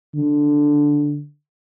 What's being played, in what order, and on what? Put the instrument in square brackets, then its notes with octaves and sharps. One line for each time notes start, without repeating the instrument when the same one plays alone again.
[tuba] D3